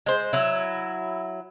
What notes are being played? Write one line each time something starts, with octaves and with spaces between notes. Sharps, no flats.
G#3 C5
F#3 E4